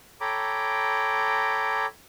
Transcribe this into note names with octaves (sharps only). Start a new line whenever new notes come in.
A4 C#5 G5 A#5 B5 D6